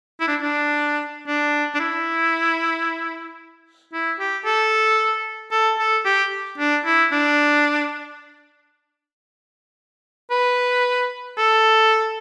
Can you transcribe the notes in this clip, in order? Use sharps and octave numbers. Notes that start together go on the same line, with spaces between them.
E4
D4
D4
D4
D4
E4
E4
G4
A4
A4
A4
G4
D4
E4
D4
B4
A4